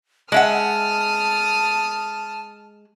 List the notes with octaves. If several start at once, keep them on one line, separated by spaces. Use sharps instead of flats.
G#3 E5 F#5 A5 D#6 F6